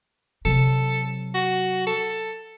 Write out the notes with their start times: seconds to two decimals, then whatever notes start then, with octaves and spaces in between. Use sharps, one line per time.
0.45 C3 F#3 A4
1.34 F#4
1.87 A4